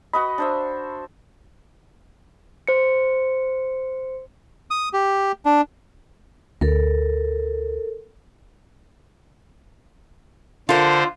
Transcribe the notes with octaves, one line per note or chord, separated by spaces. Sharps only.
F#4 B4 D#5 B5
D4 C5 E5
C5 C#7
D#6
G4
D4
D2 A4 A#4
D3 F4 A4 A#4 C5